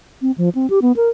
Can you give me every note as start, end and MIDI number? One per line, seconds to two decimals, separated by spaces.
0.22 0.31 60
0.38 0.49 53
0.55 0.69 60
0.70 0.79 67
0.82 0.92 59
0.96 1.09 70